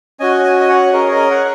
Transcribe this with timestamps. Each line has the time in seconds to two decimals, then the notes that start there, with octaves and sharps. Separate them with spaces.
0.20 C#4 F#4 D#5 G#5
0.44 G#5
0.60 D#5 G#5
0.69 C#5 F#5
0.93 C#4 G#4 A#4 D#5
1.08 C#5
1.12 A#4 D#5
1.31 C#5 F#5